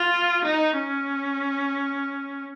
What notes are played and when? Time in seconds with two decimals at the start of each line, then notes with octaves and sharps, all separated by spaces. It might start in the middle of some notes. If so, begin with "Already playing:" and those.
Already playing: F4
0.44 D#4
0.76 C#4